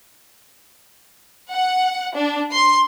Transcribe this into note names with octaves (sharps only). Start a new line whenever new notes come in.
F#5
D4
C6